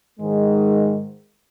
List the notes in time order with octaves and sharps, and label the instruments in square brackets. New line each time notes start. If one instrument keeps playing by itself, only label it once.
[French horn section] G#2 D#3 G#3